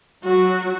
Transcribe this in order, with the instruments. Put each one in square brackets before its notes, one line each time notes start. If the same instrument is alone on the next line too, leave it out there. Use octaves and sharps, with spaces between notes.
[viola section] F#3 [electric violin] F#4